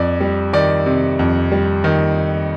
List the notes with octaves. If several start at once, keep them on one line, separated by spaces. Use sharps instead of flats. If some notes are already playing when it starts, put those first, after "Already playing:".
Already playing: F2 D5
G3
D#3 D5
C3
F2
G3
D#3